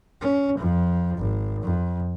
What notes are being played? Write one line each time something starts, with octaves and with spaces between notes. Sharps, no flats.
C#4
F2 F3
G#1
F2